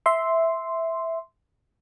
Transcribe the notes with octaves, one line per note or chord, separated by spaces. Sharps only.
E5 C6